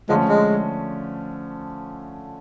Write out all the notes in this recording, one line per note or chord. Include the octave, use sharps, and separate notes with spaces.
D3 F3 G#3 A3 C#4
G#3